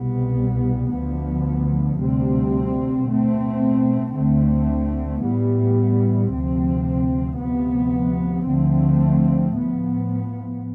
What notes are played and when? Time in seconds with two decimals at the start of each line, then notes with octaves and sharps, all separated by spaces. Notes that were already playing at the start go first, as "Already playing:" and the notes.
Already playing: C2 B2 G3 B3
0.91 D2 D3 F3 B3
1.99 D2 C3 G3 C4
3.07 B2 A3 C4
4.15 D2 D3 A3 C4
5.23 A2 E3 G3 B3
6.31 D2 C3 F3 C4
7.39 D2 C3 F3 B3
8.46 D2 D3 F3 A3 C4
9.55 A2 F3 B3